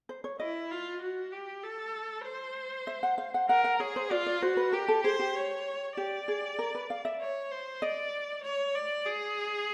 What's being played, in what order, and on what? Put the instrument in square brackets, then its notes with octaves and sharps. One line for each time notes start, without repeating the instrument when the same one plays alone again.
[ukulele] C5
C#5
[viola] E4 [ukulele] D#5
[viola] F4
F#4
G4
A4
C5
[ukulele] E5
F#5
F5
F#5
[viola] A#4 [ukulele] F#5
[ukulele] F#5
[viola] G#4 [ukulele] C#5
[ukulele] C5
[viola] F4 [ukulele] D5
[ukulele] D5
[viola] F#4 [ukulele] C5
[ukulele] B4
[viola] G4 [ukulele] A#4
[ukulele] A4
[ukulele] G#4 [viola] C5
[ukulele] G4
[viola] C#5
[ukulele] G4 [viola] D5
[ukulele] G#4
A#4
B4
F5
E5
[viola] C#5
C5
[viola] D5 [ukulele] D#5
[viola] C#5
D5
G#4